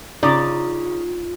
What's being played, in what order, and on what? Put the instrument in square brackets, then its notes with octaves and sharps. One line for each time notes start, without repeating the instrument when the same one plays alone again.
[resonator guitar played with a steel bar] C#3 [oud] D#4 [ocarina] F4 [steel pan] D5